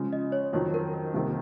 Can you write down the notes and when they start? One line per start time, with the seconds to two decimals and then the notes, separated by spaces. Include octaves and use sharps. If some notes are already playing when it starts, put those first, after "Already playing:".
Already playing: C#3 F3 G#3
0.13 D#5
0.32 C#5
0.53 F2 D#3 F#3 C#5
0.74 A#4
0.93 A#4
1.14 C2 C3 D#3 A#3